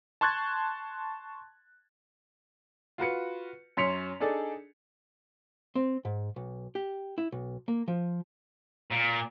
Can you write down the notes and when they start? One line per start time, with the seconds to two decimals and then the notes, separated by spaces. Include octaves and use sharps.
0.21 A5 C6 C#6 F#6 G#6 A6
2.98 F4 F#4 B4 C#7
3.77 F#2 C#4 C6 B6 C#7 F7
4.20 D4 D#4 G#4 A4 D5
5.75 C4
6.05 G#2
6.36 B1
6.75 G4
7.18 E4
7.32 B1
7.68 A#3
7.88 F3
8.91 A#2